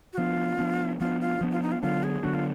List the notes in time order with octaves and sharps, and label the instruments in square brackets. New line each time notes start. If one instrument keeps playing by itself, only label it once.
[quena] F#4
[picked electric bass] F3 B3 D4 [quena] F4
[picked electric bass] F3 B3 D4
[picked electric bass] F3 B3 D4 [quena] F4
[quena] F4
[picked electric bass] F3 B3 D4
[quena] F4
D#4
F4
[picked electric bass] D3 F#3 B3 D4 [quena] F4
[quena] G#4
[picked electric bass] D3 F#3 B3 D4 [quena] F#4
[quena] F4